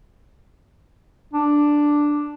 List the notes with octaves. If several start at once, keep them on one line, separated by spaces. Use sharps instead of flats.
D4